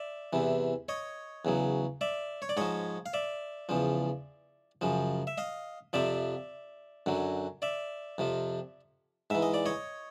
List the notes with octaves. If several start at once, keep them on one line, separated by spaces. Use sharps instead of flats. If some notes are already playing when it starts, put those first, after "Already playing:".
Already playing: D5 E5
E2 C3 E3
C#5 D#5
E2 C#3 F#3
D5 E5
C#5
D5
G#2 F3 C#5 D#5
F5
D5 E5
E2 C#3 F3
F#2 C#3 F3
E5
D#5 F5
F2 C3 F3 D5 E5
F#2 D3 F#3
D5 E5
F2 C3 F3
G#2 E3 E5
D#5
D5
C#5 D#5